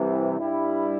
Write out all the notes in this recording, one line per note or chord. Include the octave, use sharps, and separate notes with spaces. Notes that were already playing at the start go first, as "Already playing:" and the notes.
Already playing: C2 C3 E3
G2 G3 E4